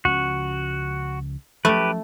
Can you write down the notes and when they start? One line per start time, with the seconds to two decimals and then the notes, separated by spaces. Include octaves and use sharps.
0.05 C#2 F3 C#4 F#4
1.65 F3 F#3 A3 C#4 G4 B4